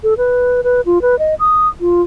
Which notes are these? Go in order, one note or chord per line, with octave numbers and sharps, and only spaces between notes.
A4
B4
B4
F4
B4
D#5
D#6
F4